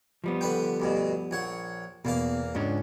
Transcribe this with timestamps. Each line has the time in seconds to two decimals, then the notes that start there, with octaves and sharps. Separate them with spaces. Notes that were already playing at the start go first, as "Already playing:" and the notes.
0.24 F3 G3 B3
0.41 D3 B4 G5
0.80 D2 G2 B2
1.31 A#1 C#5 F#5
2.05 E2 B2 A#3 F5
2.55 C#2 G#2 C#4 D4